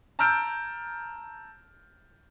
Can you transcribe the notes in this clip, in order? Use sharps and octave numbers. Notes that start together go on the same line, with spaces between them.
A5 A#5 E6 F6 G6 D7